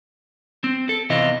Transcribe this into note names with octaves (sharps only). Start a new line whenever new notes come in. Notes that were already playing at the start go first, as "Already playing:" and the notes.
C4
A4
E2 C3 E3 F4 D#5